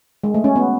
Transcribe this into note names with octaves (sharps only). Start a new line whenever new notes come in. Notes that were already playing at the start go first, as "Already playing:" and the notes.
G#3
A3
C#4
B3